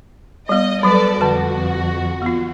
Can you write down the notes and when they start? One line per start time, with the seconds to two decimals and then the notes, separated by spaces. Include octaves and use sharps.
0.49 G3 B3 D#5
0.83 F#3 G3 A4 B4 D5
1.21 F2 D3 F#4 B4
2.22 B3 F4